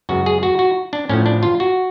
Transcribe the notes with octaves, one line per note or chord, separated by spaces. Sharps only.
F#2 C#3 G#3 B3 F#4
G#4
F#4
F#4
D4
A2 F3 A3 C#4
D4
F4
F#4